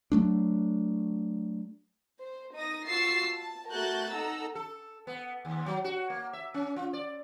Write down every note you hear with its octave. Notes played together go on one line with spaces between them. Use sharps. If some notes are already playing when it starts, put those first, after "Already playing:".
F#3 A3 D4
C5
D#4 D#6 A#6
F4 F#4 C#6 E6 A6 C7
A5
A3 F#4 A#4 F#6 G6 A6
D#4 A4 F#5 A#5 E6
A4
B3
D#2
F#3
F#4
A#3
E5
C#4
F4
D5